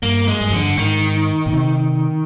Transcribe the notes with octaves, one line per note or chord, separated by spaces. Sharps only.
G2 A#3
G#3
G2
F2 D3
G2
G#2 D#3
A#2
C3